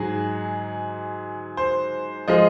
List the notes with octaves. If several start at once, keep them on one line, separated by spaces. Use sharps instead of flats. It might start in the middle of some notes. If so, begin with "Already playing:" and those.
Already playing: G#2 F#3 G#4
C5
F3 G#3 D#5